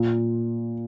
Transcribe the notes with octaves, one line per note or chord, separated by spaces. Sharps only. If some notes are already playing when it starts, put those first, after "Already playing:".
Already playing: A#2